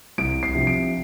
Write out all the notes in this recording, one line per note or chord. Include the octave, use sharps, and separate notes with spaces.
C2 D7
C7
C3 F3
D7